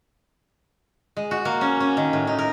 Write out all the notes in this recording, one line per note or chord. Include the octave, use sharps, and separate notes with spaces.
G#3
F#4
A#3
C#4
C#4
D#3
A2
D#4
A#4